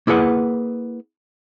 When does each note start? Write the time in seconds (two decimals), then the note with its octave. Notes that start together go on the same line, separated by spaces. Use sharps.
0.07 A#3 E4 G#4 B4 F#5